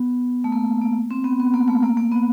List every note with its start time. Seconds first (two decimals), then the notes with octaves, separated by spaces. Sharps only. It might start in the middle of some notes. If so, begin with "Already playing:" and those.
Already playing: B3
0.44 A3
0.52 A#3
0.82 A#3
1.11 C4
1.24 B3
1.40 B3
1.54 A#3
1.68 A3
1.83 A#3
1.97 A#3
2.11 B3